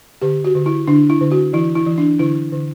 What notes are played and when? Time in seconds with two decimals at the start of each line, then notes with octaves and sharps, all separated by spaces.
0.22 D3 G4
0.45 F#4
0.55 D3
0.66 E4
0.87 D3 D4
1.10 E4
1.21 D3
1.32 F#4
1.53 E3 E4
1.75 E4
1.87 E3
1.98 D4
2.19 D3 E4
2.52 D3